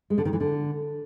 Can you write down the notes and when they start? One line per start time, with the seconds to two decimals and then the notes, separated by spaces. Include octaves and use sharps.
0.10 G#3
0.18 D3
0.25 D#3
0.33 E3
0.40 D3